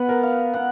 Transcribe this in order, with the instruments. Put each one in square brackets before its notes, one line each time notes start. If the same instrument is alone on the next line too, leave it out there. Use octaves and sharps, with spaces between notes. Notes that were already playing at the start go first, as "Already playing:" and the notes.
Already playing: [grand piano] B3 [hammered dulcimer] B4 F#5
[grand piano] A#4
[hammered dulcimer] F5
[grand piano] B3 [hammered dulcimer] F#5